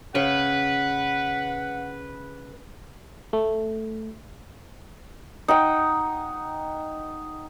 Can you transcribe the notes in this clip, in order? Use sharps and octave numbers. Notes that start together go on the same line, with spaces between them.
C#3 B4 F#5
A3
D#4 F#5 G5